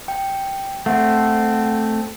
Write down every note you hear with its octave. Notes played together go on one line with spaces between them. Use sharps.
G5
A3 C4 F#5